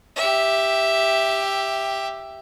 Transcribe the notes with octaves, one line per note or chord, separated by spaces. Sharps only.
G4 E5